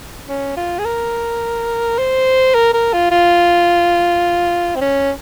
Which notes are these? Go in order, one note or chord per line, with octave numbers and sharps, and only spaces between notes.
C#4
F4
G#4
A#4
C5
A#4
A#4
F4
F4
C4
C#4